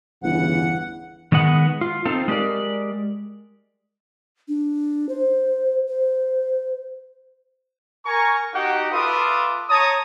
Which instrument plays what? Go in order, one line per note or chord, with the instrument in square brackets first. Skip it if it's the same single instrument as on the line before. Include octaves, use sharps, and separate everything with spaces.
[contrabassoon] G1 [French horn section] E2 C#3 E3 [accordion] F#5
[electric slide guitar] D#3 G#3 B3 F#5
F4
C4 D#4 F4 A4
G#3 G4 A#4 D5
[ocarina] D4
C5
C5
[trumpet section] A#4 G#5 A#5 C#6
D#4 F#4 G4 F5 F#5
F4 A4 B4 E5 D6 D#6
C#5 A5 A#5 D#6